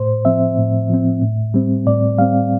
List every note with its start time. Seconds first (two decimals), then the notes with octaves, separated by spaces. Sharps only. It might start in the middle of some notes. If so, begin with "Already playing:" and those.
Already playing: A2 C5
0.25 F3 C4 E5
0.58 A2
0.89 F3 C4
1.22 A2
1.54 G3 C4
1.87 A2 D5
2.18 G3 C4 F5